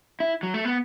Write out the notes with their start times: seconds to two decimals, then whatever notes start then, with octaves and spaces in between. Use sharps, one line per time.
0.20 E4
0.43 F#3
0.54 A3
0.65 B3